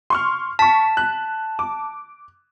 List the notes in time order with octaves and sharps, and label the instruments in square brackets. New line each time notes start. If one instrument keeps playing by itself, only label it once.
[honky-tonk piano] C6 C#6 F6
[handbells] A5 [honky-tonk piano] C#6 B6
[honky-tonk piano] F#6
D6